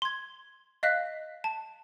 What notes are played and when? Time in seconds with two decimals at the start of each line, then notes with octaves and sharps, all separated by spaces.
0.02 C6 G#6
0.83 D#5 F5 F#6 B6
1.44 A5